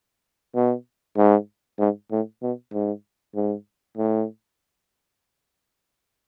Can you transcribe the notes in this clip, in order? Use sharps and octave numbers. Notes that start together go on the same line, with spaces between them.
B2
G#2
G#2
A2
B2
G#2
G#2
A2